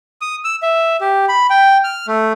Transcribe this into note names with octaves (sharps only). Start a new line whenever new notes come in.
D#6
E6
E5
G4
B5
G5
F6
A3